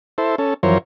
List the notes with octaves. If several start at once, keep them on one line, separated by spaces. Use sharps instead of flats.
E4 A4 C5
C#4 A4
F#2 E3 F3 A#4 C5 C#5